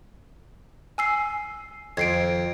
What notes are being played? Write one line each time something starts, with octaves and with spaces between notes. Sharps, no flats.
G#5 E6 C7
F2 G#6 C7 D7